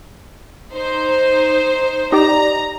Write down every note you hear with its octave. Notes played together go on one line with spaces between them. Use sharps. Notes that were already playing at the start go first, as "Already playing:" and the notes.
D#4 C5
D#4 G4 D5 A#5